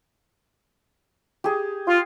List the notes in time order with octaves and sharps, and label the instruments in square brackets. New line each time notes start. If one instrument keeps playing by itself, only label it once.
[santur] G4 G#4
[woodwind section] F4